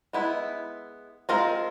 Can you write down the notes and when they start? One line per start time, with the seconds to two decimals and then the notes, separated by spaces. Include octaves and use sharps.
0.13 G#3 B3 E4
1.29 G#3 C4 F4 A#4